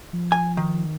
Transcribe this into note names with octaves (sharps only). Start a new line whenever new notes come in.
F3
G#5
D#3